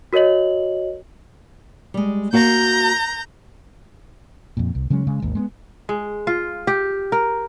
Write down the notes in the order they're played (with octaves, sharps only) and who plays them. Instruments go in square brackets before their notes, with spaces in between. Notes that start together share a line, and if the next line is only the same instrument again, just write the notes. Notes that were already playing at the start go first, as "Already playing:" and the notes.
[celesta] F#4 A#4 C#5 D#5 F#7
[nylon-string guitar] G3 G#3
[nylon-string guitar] A#3 F#4 F5 [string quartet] A#5 G6
[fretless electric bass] F2 A#2
C2
C#3 F#3 G#3 C#4
C#3 G#3
G#1 D#2
G#3 A#3 B3
[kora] G#3
F4
G4
A#4